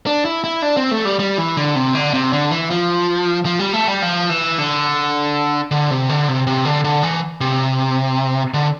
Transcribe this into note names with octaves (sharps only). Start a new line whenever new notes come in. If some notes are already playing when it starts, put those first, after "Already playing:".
D4
E4
E4
D4
C4
A3
G3
G3
E3
D3
C3
D3
C3
D3
E3
F3
F3
G3
A3
G3
F3
E3
D3
D3
C3
D3
C3
C3
D3
D3
E3
C3
D3